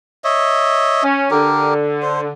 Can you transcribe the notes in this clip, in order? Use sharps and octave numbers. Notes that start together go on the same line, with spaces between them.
C#5 D#5 E5
C#4
D3 G4 A#4
C5